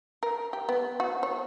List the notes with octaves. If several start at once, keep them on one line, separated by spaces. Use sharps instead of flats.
A#4
G4
B3
F#4
C#5